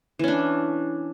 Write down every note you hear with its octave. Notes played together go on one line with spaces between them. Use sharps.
E3 C#4 D4